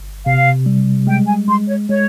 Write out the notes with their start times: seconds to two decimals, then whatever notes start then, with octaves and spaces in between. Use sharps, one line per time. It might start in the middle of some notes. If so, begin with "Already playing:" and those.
Already playing: G1
0.25 C3 F5
0.66 G3
1.07 G#3 G5
1.27 G#5
1.48 G#3 C6
1.68 C#5
1.89 G#3 C#5